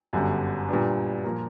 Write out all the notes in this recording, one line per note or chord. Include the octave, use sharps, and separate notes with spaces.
G1 F#2 D3 G3
A#2 G3 B3 D4
A#2 F3 A#3